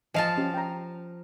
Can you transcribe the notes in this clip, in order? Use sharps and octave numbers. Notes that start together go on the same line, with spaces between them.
F3 D#5 F5 G#5 A5
C#4 G4
G5 A#5